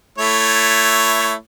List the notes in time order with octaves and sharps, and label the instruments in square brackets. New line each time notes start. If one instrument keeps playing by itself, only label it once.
[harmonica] A3 E4 C#5